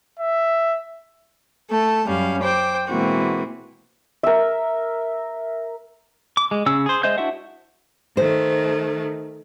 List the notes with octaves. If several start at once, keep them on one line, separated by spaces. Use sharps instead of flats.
E5
A3 A4 A5
F#2 G3 C#4 F5
C5 G5 D6
B2 E3 G#3 A#3 C4 F#4
A#4 E5
D6
G#3
C#3 C#4 E6
G#4 C5
G#3 C5 D#5 E5 G6
D4 E4 F#4 E5 F#5
D#3 A3 C5